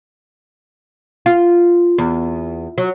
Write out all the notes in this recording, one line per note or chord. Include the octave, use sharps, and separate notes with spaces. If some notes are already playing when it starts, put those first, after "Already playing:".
F4
E2
F#3